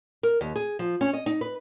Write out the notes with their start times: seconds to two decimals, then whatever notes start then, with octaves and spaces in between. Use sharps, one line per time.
0.23 A#4
0.41 D#2
0.56 G#4
0.79 F3
1.01 C#4
1.14 D#5
1.26 D#4
1.41 B4